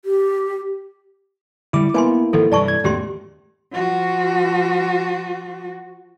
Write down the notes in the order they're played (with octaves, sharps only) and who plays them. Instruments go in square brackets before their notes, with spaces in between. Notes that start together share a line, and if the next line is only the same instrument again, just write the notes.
[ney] G4
[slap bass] D3 G3 [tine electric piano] E4 D6
[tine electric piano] A#3 E4 [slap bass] B3 [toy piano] B4 G#5 C6
[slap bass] G#1 D#3 F3 [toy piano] A4
[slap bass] G2 C3 E3 [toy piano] D5 A5 C#6
[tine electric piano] G#6
[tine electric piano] E2 [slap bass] A2 D#3 G#3 [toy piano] C#4 G4 C6
[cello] F3 F#4